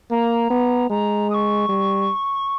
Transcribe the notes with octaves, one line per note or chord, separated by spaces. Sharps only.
A#3 A#5
B3
G#3 A#5
D#6
C#6
G3